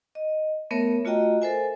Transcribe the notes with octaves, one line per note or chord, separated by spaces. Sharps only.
D#5
A3 B3 A#4 C#5 E5
A3 F4 F#4 D#5 G5 A#5
A4 A#4 C5 E5 G#5